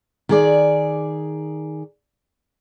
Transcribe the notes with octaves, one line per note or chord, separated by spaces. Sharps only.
D#3 G#4 D5